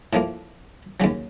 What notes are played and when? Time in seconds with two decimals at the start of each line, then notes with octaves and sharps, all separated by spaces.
0.13 A2 F3 A#3
1.00 D#2 C#3 F#3